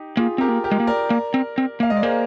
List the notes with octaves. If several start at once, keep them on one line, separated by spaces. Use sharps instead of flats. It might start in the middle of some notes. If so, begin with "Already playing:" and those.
Already playing: D#4 G4
A#3 F4 G#4
C4 G4 A#4
A#3
G4 A#4
G#3
A#3
A#4 D5
A#3
C4
C4
A#3 F5
G#3 D#5
D5
A#3 G#4 C5